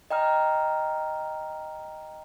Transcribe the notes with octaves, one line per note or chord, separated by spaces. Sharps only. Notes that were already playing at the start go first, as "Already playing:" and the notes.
D#5 G5 A#5 F6